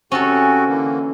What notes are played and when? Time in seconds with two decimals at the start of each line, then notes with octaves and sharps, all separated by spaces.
0.12 C3 C4 C#4 F#4 A4
0.69 D3 E3 A#3